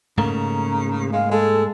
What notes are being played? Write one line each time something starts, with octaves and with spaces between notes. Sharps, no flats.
G#2 C#3 A3 A#3 A#5
G#3 F5
G#3 A4